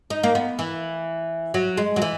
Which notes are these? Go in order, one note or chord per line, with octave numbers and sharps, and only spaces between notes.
D#4
A#3
B3
E3
F#3
G#3
F#3
E3